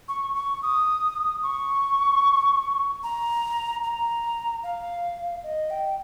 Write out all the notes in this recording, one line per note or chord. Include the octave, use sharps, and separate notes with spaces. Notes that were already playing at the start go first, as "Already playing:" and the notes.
C#6
C#6
D#6
C#6
A#5
A#5
F5
D#5
G5